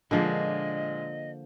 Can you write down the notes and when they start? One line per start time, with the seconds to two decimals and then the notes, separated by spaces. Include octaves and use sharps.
0.11 A#2 D3 F3 G#3 A#3 D#5